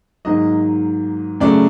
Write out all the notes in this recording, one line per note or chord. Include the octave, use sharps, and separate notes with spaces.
G#2 D#3 F#3 A#3 D#5
F#2 C#3 F#3 A3 D5